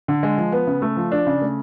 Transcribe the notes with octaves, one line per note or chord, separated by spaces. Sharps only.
D3
G#3
F3
B3
C#3
A3
F3
D4
C#3
A3